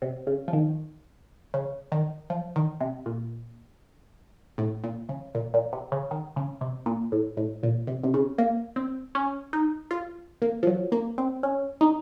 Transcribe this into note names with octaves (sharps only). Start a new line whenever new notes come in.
C3
C#3
F3
D#3
C#3
D#3
F3
D#3
C3
A#2
A2
A#2
C#3
A#2
A#2
C3
C#3
D#3
C#3
C3
A#2
A2
A2
A#2
C3
C3
C#3
A#3
C4
C#4
D#4
F4
A#3
F3
F#3
A#3
C4
C#4
D#4